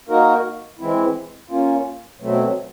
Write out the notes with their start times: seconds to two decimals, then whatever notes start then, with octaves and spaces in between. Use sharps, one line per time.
0.09 A#3 D#4 F#4 A#4
0.79 E3 G#3 C4 E4
1.50 A#3 C#4 F4
2.20 B2 F#3 A3 C4